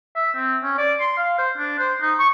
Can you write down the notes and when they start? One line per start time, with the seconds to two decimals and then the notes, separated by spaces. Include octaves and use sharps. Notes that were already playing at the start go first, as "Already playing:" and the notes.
0.16 E5
0.36 C4
0.63 C#4
0.78 D5
1.00 C6
1.17 F5
1.38 C5
1.58 D4
1.79 C5
2.01 D#4
2.19 C#6